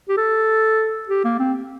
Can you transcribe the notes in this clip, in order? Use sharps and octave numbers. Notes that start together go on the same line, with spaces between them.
G4
A4
G4
A#3
C4